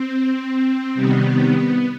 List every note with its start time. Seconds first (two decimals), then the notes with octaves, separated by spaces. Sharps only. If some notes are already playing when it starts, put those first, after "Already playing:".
Already playing: C4
0.94 C3 D#3 G3 B3